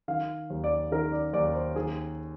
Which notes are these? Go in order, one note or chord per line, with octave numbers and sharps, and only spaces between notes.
D#3 F5
D#2
D5
D#3 A#4
D5
D#2 D5
C5
D#3 G#4